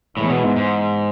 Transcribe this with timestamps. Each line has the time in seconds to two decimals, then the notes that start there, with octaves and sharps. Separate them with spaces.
0.17 A2 E3 G#3 B3
0.30 B2
0.44 G#2
0.56 G#2